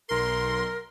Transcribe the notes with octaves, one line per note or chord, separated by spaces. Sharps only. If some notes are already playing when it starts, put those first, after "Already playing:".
B1 A#4 C6